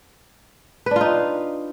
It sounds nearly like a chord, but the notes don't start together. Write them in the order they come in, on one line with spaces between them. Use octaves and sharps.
B4 D4 F4 D#4